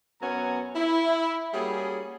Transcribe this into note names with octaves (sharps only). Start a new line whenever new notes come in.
F#2 B3 C#5 F#5 G#5 A#5
E4
G3 A#3 C#4 F#4 G#4